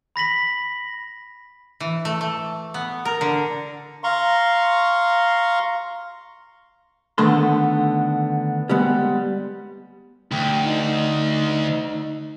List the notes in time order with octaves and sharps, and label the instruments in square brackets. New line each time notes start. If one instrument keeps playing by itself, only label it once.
[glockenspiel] B5 A#6 B6 F#7
[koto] E3
A3
A3
B3
A#4
D3
[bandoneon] F5 A#5 C6 C#6
[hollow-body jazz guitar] D3 D#3 A3 B3 A4 C6
G3 G#3 B3
[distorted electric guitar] D2 [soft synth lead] G5
[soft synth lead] D#4